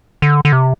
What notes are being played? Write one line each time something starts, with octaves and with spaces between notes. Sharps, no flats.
D3
D3
C3